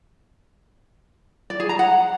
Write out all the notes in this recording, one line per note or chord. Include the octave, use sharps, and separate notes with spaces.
D5
G#4
A#5
F#5